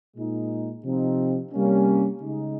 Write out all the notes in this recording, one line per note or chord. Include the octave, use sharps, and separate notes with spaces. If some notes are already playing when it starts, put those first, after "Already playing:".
A#2 G#3 D#4
C3 F3 C4 D#4
C3 G3 A#3 C#4
C#3 G#3 D#4